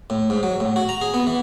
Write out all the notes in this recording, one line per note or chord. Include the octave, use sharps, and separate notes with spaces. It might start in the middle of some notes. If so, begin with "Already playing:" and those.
A2
G#2
F#3
A2
F#4
A#5
G#4
B3
E3